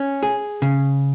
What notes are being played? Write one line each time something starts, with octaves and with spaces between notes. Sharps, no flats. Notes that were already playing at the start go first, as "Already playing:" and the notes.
Already playing: C#4
G#4
C#3